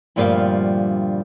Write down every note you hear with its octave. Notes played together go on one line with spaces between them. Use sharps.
D2 G2 A#2 F3 G3 F5